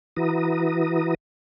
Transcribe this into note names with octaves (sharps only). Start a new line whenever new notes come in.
E3 E4 F#4 B4 A#5 D#6